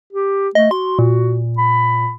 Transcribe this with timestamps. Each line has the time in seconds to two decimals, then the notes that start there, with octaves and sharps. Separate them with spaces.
0.13 G4
0.55 A3 D#5
0.71 F#4 C6
0.99 A#2
1.58 B5